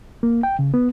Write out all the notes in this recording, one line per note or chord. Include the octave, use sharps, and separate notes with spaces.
A#3
G5
C#3
B3